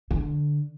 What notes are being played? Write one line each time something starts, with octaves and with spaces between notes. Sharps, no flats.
D3